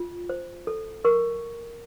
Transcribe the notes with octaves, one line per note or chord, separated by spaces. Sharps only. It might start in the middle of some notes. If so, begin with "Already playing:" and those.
Already playing: F4
C5
A4
A#4 C#6